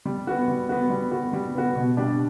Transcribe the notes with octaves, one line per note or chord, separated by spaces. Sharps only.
G3
B3 F#4
G3
B3 F#4
G3
B3 F#4
G3
B3 F#4
B2
G3 D4 G4